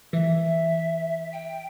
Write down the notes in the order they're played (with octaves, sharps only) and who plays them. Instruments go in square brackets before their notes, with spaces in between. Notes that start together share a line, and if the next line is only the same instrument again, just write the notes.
[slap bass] E3 [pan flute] E5
[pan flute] G5